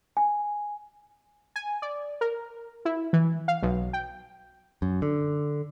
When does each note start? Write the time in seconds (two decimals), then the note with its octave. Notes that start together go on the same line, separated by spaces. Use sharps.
0.17 G#5
1.56 G#5
1.82 D5
2.21 A#4
2.85 E4
3.13 E3
3.48 F5
3.63 B1
3.93 G5
4.82 F#2
5.02 D3